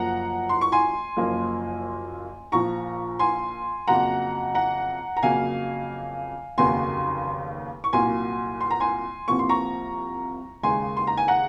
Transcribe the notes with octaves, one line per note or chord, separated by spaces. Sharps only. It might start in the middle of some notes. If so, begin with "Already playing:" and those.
Already playing: F#1 F#2 F3 A#3 F#5 A#5
C6
C#6
G#5 C6
F#1 F#2 F3 A#3
A#1 A#2 F3 A#5 C#6
G#5 C6
F2 C#3 F#3 A#3 F#5 A#5
F#5 A#5
A#5
F2 C#3 F#3 A#3 F5 G#5
F1 D#2 C#3 F#3 A#3 G#5 C6
C#6
C2 A#2 F#3 A#3 G#5 C6
C6
A#5
G#5 C6
C2 C3 F3 A#3 C#6
C6
A#5 C#6
D#2 C#3 G#3 G#5 C6
C6
A#5
G#5
F#5 A#5